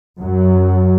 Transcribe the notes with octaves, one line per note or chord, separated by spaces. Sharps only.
F#2 F#3